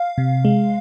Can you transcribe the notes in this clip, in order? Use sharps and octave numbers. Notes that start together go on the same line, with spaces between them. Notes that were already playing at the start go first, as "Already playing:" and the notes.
Already playing: F5
C3
G#3